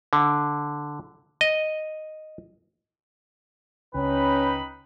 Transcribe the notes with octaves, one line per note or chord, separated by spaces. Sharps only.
D3
D#5
C#2 C#4 D#4 B4 G5 B5